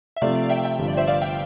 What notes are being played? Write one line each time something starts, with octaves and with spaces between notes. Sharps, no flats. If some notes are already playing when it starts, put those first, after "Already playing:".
E5
C3 F3 A3 D5 F5
E5 G5
E5 G5
G1 G2 F3
D5
C5 E5
D5 F5
E5 G5